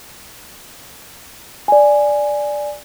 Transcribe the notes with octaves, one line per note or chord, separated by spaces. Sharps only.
D5 G#5